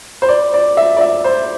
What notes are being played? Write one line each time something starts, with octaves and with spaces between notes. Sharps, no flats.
C5
D5
D5
E5
D5
E5
C5